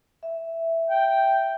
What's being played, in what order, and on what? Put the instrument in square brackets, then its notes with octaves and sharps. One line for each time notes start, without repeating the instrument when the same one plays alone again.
[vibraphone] E5
[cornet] G5